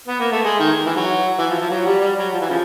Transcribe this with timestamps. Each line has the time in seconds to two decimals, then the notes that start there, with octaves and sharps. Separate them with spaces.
0.08 B3
0.20 A#3
0.32 A3
0.45 G#3
0.59 D#3
0.86 E3
0.96 F#3
1.38 E3
1.50 F3
1.60 F3
1.70 F#3
1.86 G3
2.01 G3
2.18 F#3
2.33 F3
2.41 E3
2.49 C#3 F3